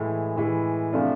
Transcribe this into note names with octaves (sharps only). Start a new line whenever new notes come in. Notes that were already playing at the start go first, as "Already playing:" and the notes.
Already playing: A2 E3 G#3
A2 E3 G#3
C3 F3 A3 D4 F4